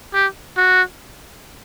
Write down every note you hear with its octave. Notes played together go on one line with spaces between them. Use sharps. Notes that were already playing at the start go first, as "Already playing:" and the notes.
G4
F#4